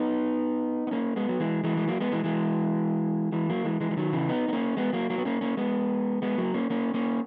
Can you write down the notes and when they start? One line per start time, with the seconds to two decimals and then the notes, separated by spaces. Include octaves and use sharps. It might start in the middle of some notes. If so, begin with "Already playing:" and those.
Already playing: B3 D#4
0.87 B3
0.91 A#3 C#4
1.16 G#3 B3
1.29 F#3
1.40 E3 G#3
1.64 E3 G#3
1.77 G#3
1.88 F#3 A#3
2.01 G#3 B3
2.12 E3 G#3
2.24 E3 G#3
3.32 E3 G#3
3.49 F#3 A#3
3.64 E3 G#3
3.81 E3 G#3
3.91 E3
3.97 D#3 F#3
4.13 C#3 E3
4.29 B3 D#4
4.48 B3
4.53 A#3 C#4
4.77 G#3 B3
4.93 F#3 A#3
5.10 F#3 A#3
5.18 B3
5.25 A#3 C#4
5.41 A#3 C#4
5.57 G#3 B3
6.22 G#3 B3
6.38 F#3 A#3
6.54 A#3 C#4
6.70 A#3 C#4
6.94 A#3 C#4